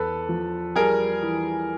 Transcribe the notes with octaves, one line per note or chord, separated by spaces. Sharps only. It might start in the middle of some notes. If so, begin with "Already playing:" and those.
Already playing: E2 A4 B4
F3
G3 G#4 A#4
E3